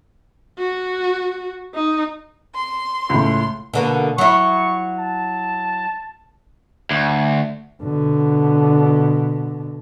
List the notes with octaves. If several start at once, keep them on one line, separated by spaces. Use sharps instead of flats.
F#4
D#4
C6
C#2 A2
B2 D3 A#3
F#3 E4 C#6
A5
D2
B2 D3